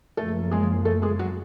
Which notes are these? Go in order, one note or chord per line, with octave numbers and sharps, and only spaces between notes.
F#1 F#2 C#3 F3 A3 A#3 A4
G#3 G#4
A3 A4
G#3 G#4
F#3 F#4